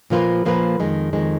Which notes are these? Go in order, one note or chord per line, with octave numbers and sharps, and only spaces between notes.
A#2 F3 A#3 F4 B4
A#2 F3 A#3 F4 B4
F2 D#3 G#3
F2 D#3 G#3